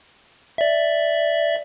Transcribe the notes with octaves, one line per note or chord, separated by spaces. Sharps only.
D5 E5